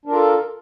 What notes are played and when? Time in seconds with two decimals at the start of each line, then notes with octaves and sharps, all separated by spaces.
0.06 D4
0.08 A#4
0.11 F4
0.14 A4